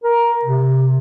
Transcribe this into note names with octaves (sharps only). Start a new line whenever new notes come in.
A#4
C3